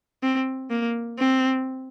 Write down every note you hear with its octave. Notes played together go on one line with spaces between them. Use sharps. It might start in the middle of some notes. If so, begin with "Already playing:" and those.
C4
A#3
C4